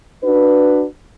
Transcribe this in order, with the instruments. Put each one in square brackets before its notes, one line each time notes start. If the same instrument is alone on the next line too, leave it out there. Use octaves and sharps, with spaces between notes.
[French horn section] D4 F#4 B4